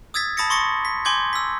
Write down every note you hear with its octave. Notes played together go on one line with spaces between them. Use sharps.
D#6 E6 G#6 A6 B6
A5 B5 D#6 A6 A#6 C#7
C6 C#6 D#6 A6 A#6 C#7
B6
G#5 C6 D6 G6 G#6
E6 B6